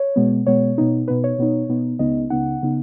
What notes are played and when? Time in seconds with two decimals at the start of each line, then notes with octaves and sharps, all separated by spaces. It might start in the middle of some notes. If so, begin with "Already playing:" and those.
Already playing: C#5
0.16 B2 G#3 B3
0.47 B2 G#3 B3 C#5
0.78 B2 B3 D#4
1.07 B2 B3 D#4 B4
1.24 C#5
1.39 B2 B3 D#4
1.69 B2 B3 D#4
1.99 C#2 C#3 B3 D#4 D#5
2.30 C#2 C#3 B3 D#4 F#5
2.63 C#3 B3 D#4